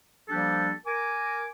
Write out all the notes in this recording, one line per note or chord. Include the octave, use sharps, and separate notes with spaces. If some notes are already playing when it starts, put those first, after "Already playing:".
F3 G3 A#3 D4 G4 A4
A#4 G#5 D6